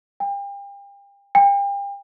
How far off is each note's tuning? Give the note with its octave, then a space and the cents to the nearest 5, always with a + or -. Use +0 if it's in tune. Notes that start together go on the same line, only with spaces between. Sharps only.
G5 +35
G5 +35